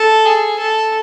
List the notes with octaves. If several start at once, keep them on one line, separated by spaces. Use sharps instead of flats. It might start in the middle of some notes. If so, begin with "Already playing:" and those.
Already playing: A4
G#4
A4